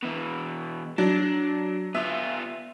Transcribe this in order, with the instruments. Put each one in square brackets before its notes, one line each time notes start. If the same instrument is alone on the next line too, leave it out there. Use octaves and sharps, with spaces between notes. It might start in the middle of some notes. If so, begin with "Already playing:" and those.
[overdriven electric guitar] B2 E3
[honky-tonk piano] F#3 [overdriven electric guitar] D4
[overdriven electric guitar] B3 F4 [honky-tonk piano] E5